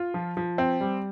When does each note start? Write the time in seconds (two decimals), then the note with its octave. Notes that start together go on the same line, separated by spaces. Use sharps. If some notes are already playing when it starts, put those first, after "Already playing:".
Already playing: F4
0.14 F3
0.37 F3
0.58 C4
0.80 G3